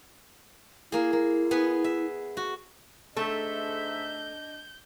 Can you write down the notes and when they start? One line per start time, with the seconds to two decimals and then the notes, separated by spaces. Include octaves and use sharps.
0.92 A#3 E4 G#4
1.13 A#3
1.51 B3 G#4 B4
1.84 E5
2.37 F#4
3.16 G#2 A3 D4 A4 D#5 E5 G6